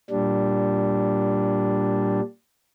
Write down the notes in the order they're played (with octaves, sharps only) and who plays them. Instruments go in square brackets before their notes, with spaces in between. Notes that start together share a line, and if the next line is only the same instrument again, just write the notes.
[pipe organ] A#2 G3 D4